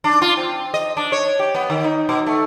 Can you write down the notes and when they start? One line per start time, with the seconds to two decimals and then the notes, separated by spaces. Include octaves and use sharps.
0.04 D4
0.22 F4
0.37 C4
0.74 D#5
0.97 D4
1.12 C#5
1.39 G4
1.55 B3
1.70 D#3
1.84 D#4
2.09 B2
2.26 A3